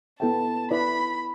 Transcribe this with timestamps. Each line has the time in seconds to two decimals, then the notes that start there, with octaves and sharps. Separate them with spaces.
0.20 B3 E4 A4 E5 G5 A5
0.71 E4 B4 D5 B5